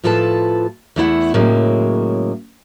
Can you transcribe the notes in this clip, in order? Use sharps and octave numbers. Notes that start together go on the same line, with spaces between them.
A2 F3 F4 A4 B4 A5
E2 A3 E4 F#5
A2 C#3 F#3 G#3 A#3